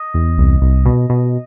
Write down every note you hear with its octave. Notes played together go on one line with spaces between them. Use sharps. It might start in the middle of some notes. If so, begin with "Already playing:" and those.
Already playing: D#5
E2
C2
C2
B2
B2